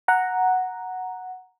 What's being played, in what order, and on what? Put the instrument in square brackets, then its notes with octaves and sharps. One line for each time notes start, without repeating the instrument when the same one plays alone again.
[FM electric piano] F#5 A#5